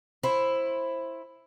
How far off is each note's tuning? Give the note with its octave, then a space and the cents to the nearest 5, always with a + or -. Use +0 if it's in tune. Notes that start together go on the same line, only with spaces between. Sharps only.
E4 +5 C5 +15